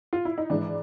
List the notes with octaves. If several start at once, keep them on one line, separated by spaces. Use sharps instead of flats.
F4
E4
D#4
G#2 E3 D4